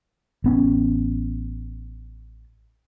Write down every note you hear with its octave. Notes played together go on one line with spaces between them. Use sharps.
A1 B3 C#4